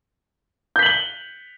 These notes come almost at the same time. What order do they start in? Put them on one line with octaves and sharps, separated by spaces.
G6 B6 F#7 G7